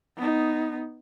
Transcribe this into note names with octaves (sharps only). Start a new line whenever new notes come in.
B3 D#4